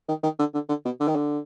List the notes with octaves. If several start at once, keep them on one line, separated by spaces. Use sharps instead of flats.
D#3
D#3
D3
D3
D3
B2
D3
D#3
D3